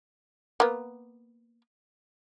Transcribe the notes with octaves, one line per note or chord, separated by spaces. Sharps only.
A#3 B3